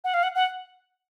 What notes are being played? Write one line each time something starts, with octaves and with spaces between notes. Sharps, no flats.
F#5
F5
F#5
F#5